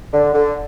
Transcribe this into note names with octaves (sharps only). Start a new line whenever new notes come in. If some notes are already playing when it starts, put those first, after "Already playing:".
D3
D3